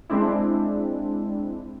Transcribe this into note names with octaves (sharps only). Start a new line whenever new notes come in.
G#3 C4 D4 E4